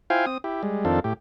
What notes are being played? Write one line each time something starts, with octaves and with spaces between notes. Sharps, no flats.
E4 F4 C5 F5 G5 G#5
C4 D#6
E4 G4
G3 G#3
F2 D#3 C4 D4 F4 A4
A2 G4